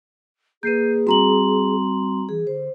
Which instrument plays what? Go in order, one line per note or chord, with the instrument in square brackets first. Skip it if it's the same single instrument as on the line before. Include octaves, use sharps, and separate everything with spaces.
[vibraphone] A#3 B4 [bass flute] G#4 [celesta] G6 C7 D#7
[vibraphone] G3 C4 C6 [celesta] F#4 A#5 F#7
[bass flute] E3 [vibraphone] G#4
[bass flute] D3 [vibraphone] C5